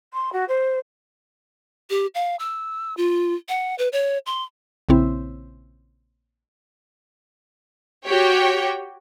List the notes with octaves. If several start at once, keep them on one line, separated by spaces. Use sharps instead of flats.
C6
F#4
C5
G4
F5
E6
F4
F#5
B4
C#5
C6
A#1 C#3 C4 E4
F#4 G4 C#5 G5